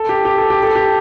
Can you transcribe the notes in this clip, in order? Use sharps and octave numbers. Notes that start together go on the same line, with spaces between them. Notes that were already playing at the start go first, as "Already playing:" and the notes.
Already playing: A4
G4
G4
A4
G4
A4
G4